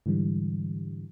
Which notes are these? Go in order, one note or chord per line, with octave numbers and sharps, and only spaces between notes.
G#2 D3 E3 G3